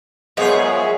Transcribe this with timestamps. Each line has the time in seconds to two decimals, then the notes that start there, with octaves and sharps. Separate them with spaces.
0.37 F#2 F3 G#3 B3 G#4 C#5